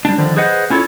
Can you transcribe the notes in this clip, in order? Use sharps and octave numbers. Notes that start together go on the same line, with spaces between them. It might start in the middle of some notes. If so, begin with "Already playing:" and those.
G3 D4
D3 D#3 F3
G#4 B4 C5 D#5 F#5
C#4 E4 F4 A4 C#5